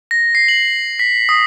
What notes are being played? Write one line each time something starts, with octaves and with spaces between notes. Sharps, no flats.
A#6
C7
F#7
B6
D#6